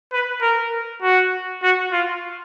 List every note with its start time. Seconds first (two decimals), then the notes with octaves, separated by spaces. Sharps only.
0.13 B4
0.42 A#4
1.02 F#4
1.63 F#4
1.92 F4